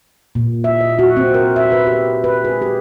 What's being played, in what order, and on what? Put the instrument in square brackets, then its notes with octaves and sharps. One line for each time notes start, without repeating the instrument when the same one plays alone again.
[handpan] A#2
E5
D#5
F#4
C4
A#4
E5
B4
G4
B4
G#4
G4